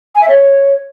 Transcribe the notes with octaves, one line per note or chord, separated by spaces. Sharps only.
G#5
E5
C#5